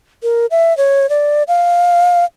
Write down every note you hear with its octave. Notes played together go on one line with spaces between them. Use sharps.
A#4
E5
C#5
D5
F5